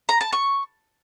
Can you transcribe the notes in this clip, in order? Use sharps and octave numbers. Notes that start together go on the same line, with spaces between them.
A#5
A5
C#6